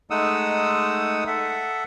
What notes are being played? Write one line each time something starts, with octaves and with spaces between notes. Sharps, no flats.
G#3 A3 D#4 F#5 D#6 E6
A4 E5 F#5